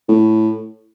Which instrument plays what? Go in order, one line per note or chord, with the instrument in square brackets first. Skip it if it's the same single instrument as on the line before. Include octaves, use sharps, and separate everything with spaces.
[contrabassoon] A2